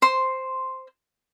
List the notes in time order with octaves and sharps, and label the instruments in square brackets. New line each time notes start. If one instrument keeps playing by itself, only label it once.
[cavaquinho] C5 C6